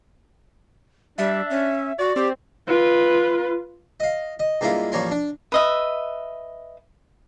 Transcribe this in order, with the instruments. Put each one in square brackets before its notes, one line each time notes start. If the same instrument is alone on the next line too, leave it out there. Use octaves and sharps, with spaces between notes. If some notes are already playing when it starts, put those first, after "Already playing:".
[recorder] G3 [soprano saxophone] D4 [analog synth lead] E5
[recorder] C#4
[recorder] F#4 [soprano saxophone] D5
[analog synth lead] C4 [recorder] G4
[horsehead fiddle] F4 B4
[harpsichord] D#5 F5
D#5
G2 G#3 A#3 E4 F4
A1 F3 G3 A#3 C#5 C6
D4
[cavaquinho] B4 D#5 E5